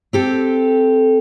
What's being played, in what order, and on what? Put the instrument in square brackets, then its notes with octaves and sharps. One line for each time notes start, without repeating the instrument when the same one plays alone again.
[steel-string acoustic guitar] C4 G4 A4